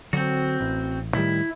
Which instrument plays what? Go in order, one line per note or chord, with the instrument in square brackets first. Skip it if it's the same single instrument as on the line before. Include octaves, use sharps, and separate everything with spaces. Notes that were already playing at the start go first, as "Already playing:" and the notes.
[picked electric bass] D3 F#3 [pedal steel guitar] C4 F#4
[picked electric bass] A1
[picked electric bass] A2 D#3 G3 [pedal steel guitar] E4